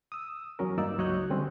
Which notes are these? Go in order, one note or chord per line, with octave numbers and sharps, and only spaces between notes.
D#6 E6
E2 F#3 C#4 A#4
G2 A#3 D#4 D5 E6
C#2 F#3 C#5 D#5 F#6 G6
D3 G3 C4 C#4